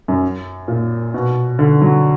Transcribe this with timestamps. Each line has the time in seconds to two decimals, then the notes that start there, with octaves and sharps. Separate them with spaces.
0.08 F#2
0.68 A#2
1.14 B2
1.59 D3
1.82 F#3